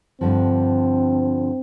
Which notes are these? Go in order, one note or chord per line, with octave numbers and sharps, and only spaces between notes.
G2 D3 F3 C4